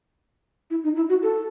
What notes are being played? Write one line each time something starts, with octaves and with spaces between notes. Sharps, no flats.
E4
D#4
E4
F#4
A4